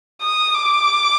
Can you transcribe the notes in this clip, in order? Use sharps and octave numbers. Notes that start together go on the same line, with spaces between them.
D#6
D6